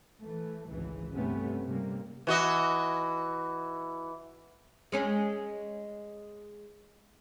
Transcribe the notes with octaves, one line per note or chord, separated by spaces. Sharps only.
E3 A3
G#1 C#2 E3
G2 C3 A3 B3 C#4
C3 G3 A#3
E3 F#4 D#5
G#3 C#4 G#4